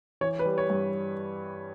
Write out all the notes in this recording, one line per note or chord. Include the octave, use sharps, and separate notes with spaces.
E3 C#5
B4
G3
C#5
G2